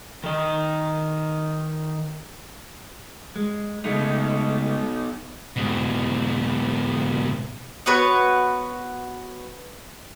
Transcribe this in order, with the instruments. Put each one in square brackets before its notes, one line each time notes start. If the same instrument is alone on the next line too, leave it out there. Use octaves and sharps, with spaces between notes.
[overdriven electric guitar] D#3 D#5
[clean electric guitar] G#3
[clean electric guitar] C#2 G#3 A3 [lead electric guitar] B2 D#4
[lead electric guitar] G#2 B2
[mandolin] B3 F#4 B4 C#5